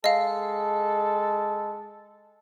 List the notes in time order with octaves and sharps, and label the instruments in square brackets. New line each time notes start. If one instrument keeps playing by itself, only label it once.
[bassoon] G#3 [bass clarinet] A4 [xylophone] D#5 F5